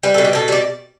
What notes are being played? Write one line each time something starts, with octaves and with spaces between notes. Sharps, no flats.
G3 B4
B2 A4
G4
B2 A4
G3 D5